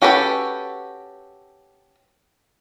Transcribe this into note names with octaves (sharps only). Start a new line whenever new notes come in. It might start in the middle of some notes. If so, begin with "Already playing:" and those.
C#4 F#4 G4 A4 B4